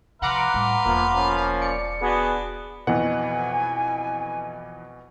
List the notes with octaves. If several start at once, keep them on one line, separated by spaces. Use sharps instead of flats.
C3 F3 B4 F5 F#5 A#5 C6 D6
A2 G3
E1 F3 A#3
F3 A#3 C#4
D5 C#7
B3 D4 F#4 G#4 B4
F2 B2 E3 F#5 G#5